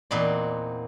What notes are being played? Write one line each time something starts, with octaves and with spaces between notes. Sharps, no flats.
E2 A#2 C4 D#4 F#4 D5